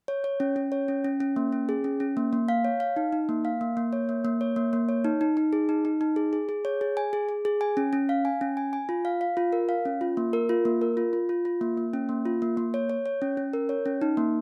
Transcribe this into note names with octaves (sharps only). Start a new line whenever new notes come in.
C#5
C#5
C#4
C#4
C#5
C#4
C#4
C#4
A#3
C#4
G#4
C#4
C#4
A#3
A#3
F5
C#5
F5
D#4
D#4
A#3
F5
A#3
A#3
C#5
A#3
A#3
C#5
A#3
A#3
C#5
D#4
D#4
D#4
G#4
D#4
D#4
D#4
G#4
G#4
G#4
C#5
G#4
G#5
G#4
G#4
G#4
G#5
C#4
C#4
F5
G#5
C#4
G#5
G#5
F4
F5
F5
F4
A#4
F5
C#4
F4
A#3
A#4
F4
A#3
A#4
F4
F4
F4
F4
A#3
A#3
C#4
A#3
F4
A#3
A#3
C#5
C#5
C#5
C#4
C#4
A#4
C#5
C#4
D#4
A#3